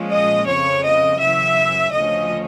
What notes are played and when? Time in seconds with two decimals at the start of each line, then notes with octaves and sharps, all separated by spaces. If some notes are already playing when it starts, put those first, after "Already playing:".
Already playing: A#2 F3 G#3 C#4
0.11 D#5
0.47 F2 C#3 F3 C#5
0.84 D#5
1.20 F#2 C#3 E3 E5
1.92 D2 C#3 F3 A3 C#4 D#5